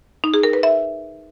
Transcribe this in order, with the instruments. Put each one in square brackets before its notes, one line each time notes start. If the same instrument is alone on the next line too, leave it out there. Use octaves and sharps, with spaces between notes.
[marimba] D#4
G#4
A#4
B4
E5